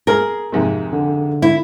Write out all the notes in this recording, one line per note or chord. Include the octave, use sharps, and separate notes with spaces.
G#4 A#4 F6
F2 G#2 C3
D3
E4